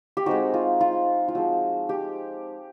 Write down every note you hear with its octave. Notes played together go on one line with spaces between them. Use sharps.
G4
G#3 C4 D#4 F#4
F4
F4
F4
F3 G#3 C4 F#4
G4